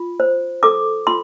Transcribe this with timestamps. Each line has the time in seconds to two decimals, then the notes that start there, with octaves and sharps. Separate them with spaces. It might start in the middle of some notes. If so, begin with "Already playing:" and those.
Already playing: F4
0.20 C5
0.63 A4 D6
1.07 F4 C6